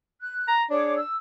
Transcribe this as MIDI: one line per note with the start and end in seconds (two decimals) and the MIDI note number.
0.21 0.52 90
0.48 0.63 82
0.70 1.01 62
0.70 0.96 68
0.70 0.96 73
0.70 0.96 86
0.97 1.15 88